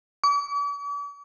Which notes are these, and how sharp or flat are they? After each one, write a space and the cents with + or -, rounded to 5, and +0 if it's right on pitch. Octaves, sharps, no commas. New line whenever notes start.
D6 -45